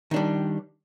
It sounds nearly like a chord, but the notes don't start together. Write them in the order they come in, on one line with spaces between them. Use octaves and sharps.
D#3 D4 G3